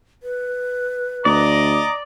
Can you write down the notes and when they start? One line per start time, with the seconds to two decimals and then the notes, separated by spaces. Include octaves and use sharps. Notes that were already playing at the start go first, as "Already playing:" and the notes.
0.23 B4
1.25 D2 D5 D#5 A#5 D6